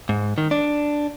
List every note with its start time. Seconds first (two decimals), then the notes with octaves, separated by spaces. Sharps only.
0.09 G#2
0.38 D#3
0.51 D4